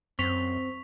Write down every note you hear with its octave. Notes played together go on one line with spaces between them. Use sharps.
F#2 C4 C#6 B6 F7